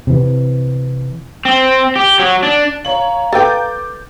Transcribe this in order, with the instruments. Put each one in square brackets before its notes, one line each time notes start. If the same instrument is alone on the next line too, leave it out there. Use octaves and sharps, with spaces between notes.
[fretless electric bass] C3 E3
[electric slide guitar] C4
G4
F#3
D4
[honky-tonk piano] C#5 F#7 [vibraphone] F5 A#5
[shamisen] A4 B4 G5 [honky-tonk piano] D6 G6 A6